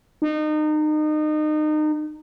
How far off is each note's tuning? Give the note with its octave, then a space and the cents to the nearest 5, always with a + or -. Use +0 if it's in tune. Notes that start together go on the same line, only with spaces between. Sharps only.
D#4 -30